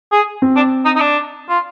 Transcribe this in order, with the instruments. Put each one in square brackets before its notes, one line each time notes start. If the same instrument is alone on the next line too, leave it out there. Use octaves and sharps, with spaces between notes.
[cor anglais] G#4
[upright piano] C4
[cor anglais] D4
D#4
D#4
D4
F4